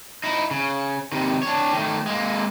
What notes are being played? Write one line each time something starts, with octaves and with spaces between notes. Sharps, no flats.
D#4 E4
C#3
C3 D#3
D4 C#5
D#3 A3
G#3 A#3